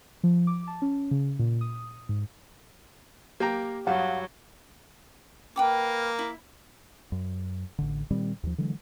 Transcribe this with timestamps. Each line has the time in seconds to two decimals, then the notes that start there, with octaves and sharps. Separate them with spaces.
0.24 F3
0.47 D6
0.67 A5
0.82 C#4
1.11 C#3
1.39 A#2
1.61 D#6
2.09 G#2
3.40 A#3 G4 G5 A#5
3.87 G2 F#3 G3 F5 F#5
5.56 A#3 B4 G5 D6
6.19 E4
7.12 F#2
7.79 A1 D3
8.11 A#2 D#3 G3 C4
8.43 D#2 F3
8.58 D3 E3 F#3 G#3